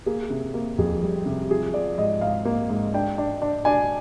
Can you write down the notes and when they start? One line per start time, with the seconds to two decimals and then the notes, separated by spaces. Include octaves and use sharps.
0.06 A#3 G#4
0.30 C3
0.54 A#3
0.78 F2 G#4
1.03 G3
1.26 C3
1.51 F3 G#4
1.74 F3 D5
1.98 G#2 D#5
2.21 G#2 F5
2.45 A#3
2.70 G#2
2.94 D4 G5
3.18 D4
3.42 D4
3.65 D4 G#5